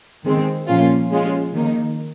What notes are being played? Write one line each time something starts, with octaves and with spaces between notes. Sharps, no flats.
D#3 G#3 C4
A#2 F3 A#3 C#4 F4
F3 G#3 C#4 F4
D#3 A#3 D#4